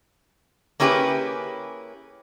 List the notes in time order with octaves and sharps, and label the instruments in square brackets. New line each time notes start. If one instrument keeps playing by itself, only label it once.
[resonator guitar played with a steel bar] A#3 C#4 E4 G4 G#4 B4